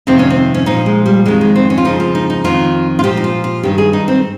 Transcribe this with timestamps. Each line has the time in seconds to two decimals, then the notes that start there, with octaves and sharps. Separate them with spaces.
0.07 F2 C3 D#3 C4
0.19 C#4
0.30 C4
0.54 C#4
0.66 A#2 F3 D#4
0.86 G#3
1.06 G3
1.26 F2 D#3 G#3
1.41 G#3
1.56 C4
1.70 C#4
1.78 F4
1.85 F2 C#3 F3 D#4
2.00 F4
2.15 D#4
2.30 D#4
2.44 F2 D#3 F4
2.99 F4
3.04 A#2 F3 G4
3.17 D#4
3.24 F4
3.44 F4
3.63 G2 D#3 G4
3.78 G#4
3.93 D#4
4.08 C4